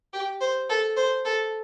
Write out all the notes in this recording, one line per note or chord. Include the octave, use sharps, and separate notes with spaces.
G4
C5
A4
C5
A4